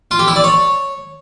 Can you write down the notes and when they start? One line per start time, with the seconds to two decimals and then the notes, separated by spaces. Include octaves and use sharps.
0.11 F4
0.19 G4
0.27 E4
0.36 D5
0.44 C#5